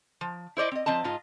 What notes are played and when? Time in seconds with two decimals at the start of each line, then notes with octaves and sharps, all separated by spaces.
0.21 F3
0.57 E4 C5 D5 D#5
0.72 C4 D#5
0.86 F3 C4 D#5 A5
1.04 G#2 F4 D#5